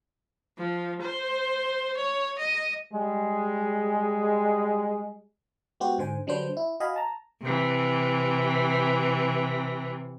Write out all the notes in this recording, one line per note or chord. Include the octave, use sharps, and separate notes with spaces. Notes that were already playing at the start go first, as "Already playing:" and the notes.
F3
C5
C#5
D#5
G3 G#3
G#3 B3 F#4 G4 C5
G#2 D3 C5 G#5
D3 F#3 G3 D4 B4 C5
E4
F#4 D#5 F5 G#5 B5
A5 A#5
C3 E3